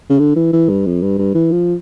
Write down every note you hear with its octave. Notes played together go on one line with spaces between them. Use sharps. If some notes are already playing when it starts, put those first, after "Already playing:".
C#3
D3
E3
E3
G2
F2
G2
G2
E3
F3